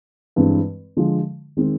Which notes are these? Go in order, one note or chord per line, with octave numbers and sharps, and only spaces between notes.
G2 E3 G#3 C4
D3 F3 G#3
D#3 G#3 C4